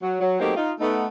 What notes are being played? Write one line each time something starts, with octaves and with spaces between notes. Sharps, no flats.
F#3
F#3
F#3 A3 A#3 C4 D#4 G4
D#4 F4
A3 B3 D#4